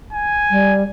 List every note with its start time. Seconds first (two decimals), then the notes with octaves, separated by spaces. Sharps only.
0.13 G#5
0.51 G3